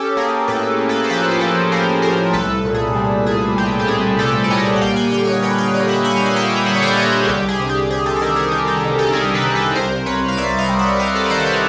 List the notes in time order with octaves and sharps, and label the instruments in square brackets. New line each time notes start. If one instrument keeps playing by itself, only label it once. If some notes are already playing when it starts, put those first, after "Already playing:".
Already playing: [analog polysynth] C#4 G4 A4
A#3 G#4 A#4
A2 A4 B4
A#3
A4 B4
C5
F3 A4 B4
C5
F3 A4 B4
F3 A#4 C5
A2 A#4 C5
C2 A4 B4
A#2
G#4
G3
A#2 G#4
C4 G4
G4
C2 G#4
A#2 G4 A4
D5
G3 C#5 D#5
F#5
A#3 F5 G5
F#5 G#5
D3 F5 G5
C#5 D#5
D3 B4 C#5
F5 G5
D3 D#5 F5
E5 F#5
A#3 F#5 G#5
F5
F#5
A#3 F5 G5
F5
D3 E5 F#5
C#5
C5 D5
D3 C#5 D#5
G#4
C2 G4
G#4
C3
G4
C3 G#4
G4 A4
A4
D#3 G#4 A#4
G#4
D#3 G4
G4 A4
D#3
G4 A4
C2 G#4 A#4
A4 B4
C3
A4 B4
C2 A#4 C5
C2 B4 C#5
F5
C2 D5 E5
D#5 F5
G3
E5 F#5
G3 D#5 F5
A4 B4
D#5
D#3 C5 D5
B4 C#5